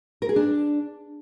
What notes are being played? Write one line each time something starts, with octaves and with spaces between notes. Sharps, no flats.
A#4
G#4
D4